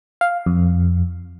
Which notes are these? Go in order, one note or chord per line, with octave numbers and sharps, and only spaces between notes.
F5
F2